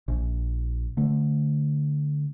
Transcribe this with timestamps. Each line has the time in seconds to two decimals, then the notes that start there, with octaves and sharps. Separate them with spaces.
0.08 A#1
0.97 D3 A3